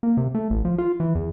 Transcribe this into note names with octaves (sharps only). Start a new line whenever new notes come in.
A#3
C3
A3
A1
F3
F4
E3
E2